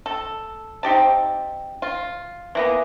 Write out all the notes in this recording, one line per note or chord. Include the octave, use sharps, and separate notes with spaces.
A4
C4 D#4 G4 A5
F4
E3 A#3 B3